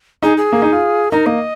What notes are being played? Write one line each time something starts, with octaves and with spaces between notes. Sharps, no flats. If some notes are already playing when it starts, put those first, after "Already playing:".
D#4 G#4
G#4
A#3
D#4
F4
D#4 A#4
A#3 D#5